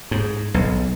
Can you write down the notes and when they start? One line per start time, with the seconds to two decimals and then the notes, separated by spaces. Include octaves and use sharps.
0.11 G#2
0.54 B1